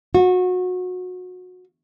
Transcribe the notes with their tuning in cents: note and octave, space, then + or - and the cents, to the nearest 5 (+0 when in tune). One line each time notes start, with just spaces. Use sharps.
F#4 -25